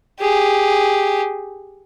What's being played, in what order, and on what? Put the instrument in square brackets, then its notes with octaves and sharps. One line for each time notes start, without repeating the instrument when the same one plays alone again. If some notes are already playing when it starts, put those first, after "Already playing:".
[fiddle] G4 G#4